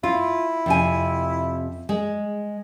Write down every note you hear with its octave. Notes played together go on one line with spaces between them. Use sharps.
E4 F4
F2 C3 G#5
G#3